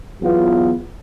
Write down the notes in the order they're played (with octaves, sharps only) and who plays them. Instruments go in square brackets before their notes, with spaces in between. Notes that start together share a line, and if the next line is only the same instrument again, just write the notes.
[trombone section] E2 F#3 B3 F4